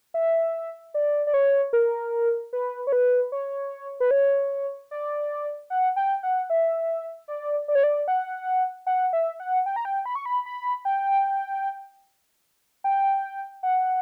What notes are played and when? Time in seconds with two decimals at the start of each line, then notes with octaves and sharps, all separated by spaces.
0.14 E5
0.94 D5
1.27 D5
1.34 C#5
1.73 A#4
2.53 B4
2.87 C#5
2.92 B4
3.32 C#5
4.00 B4
4.11 C#5
4.91 D5
5.70 F#5
5.96 G5
6.23 F#5
6.50 E5
7.28 D5
7.68 D5
7.75 C#5
7.83 D5
8.08 F#5
8.87 F#5
9.13 E5
9.40 F#5
9.66 G5
9.76 A#5
9.85 G5
10.06 B5
10.15 C#6
10.26 B5
10.46 B5
10.85 G5
12.84 G5
13.63 F#5